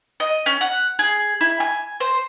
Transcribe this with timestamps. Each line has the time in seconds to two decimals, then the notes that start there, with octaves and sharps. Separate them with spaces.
0.20 D#5
0.46 C#4
0.61 F#5
0.99 G#4
1.41 E4
1.60 G#5
2.00 C5